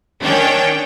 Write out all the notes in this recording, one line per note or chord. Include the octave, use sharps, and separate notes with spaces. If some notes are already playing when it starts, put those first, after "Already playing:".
D#3 C#4 D4 C#5 G5